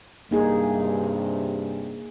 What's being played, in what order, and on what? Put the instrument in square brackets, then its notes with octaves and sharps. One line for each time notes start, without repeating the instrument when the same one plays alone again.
[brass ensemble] G2 C3 [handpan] A#3 D#4 G#4